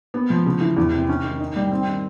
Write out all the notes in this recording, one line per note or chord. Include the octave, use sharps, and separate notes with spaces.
B3
F3
C#3
E3
E2
C3
C#4
D#3
D#4
G3
C4
D#3